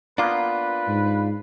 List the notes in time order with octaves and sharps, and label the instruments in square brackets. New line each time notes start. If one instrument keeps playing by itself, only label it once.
[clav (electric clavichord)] A#3 B3 [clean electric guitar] D4 F4 [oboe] B4
[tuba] G#2